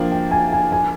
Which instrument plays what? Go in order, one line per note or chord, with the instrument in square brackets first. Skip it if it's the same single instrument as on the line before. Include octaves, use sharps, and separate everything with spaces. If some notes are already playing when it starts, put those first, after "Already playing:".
Already playing: [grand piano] F3 A#3 D4 [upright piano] F5 G5
[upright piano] G5
G#5
G#5
G#5